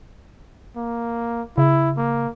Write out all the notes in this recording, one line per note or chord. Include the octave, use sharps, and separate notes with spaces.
A#3
C#3 E4
A#3